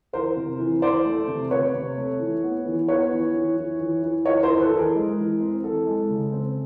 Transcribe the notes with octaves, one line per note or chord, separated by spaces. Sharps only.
E3 A#4 C5
C3
E3
E3 C5 D5
A3
C3
C3 B4 C#5
C3
A3
E3
B3
E3
B3 B4 C#5
E3
E3
E3
E3
E3
E3 C#5 D#5
A#4 C5
E3
A4 B4
E3
G#4 A#4
G#3
E3
C4
E3 A4
G#3
C#3
C4